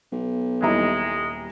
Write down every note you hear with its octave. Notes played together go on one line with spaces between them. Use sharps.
B1
D#1 G3 G#3 D#4 E4 A#5